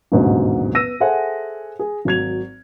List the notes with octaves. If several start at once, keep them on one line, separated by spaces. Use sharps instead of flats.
A1 D#2 G#2 B2 D3 F#3
B3 E6 A#6 D#7
G#4 A4 C5 E5 F#5 G#5
G#4
G#1 F#3 G#6 F7